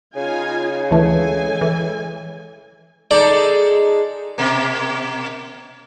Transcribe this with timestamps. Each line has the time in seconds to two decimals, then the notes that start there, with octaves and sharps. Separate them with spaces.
0.16 C#3 D#4 F4 G#5
0.91 D2 E3 G#3 A3 A4 G#5
1.61 E3
3.11 G#3 D#4 A4 D5
4.38 B2 A#3